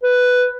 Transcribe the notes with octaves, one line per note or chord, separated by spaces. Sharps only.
B4